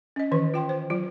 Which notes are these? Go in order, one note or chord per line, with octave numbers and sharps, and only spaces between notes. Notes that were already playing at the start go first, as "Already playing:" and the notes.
C#4 D#5
D#3 E3 B4
F4 G5 C6
C5
F#3 F4